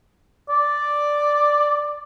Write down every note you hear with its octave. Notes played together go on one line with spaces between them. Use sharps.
D5